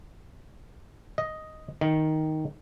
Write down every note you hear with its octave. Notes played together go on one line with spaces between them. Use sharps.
D#5
D#3